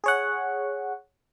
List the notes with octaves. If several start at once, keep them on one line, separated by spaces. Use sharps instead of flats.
G#4 C#5 F#5